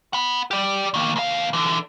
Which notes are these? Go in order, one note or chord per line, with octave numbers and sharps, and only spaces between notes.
F#5 B5
G4 D5
D#3 A#3
D#2 F5
D3 E3